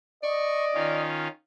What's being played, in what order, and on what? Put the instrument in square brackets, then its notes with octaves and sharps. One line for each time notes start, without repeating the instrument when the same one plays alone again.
[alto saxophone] D5 [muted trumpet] D#5 [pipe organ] C#6
[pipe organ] D#3 C#4 F4